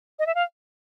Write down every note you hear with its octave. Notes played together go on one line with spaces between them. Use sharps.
D#5
E5
F5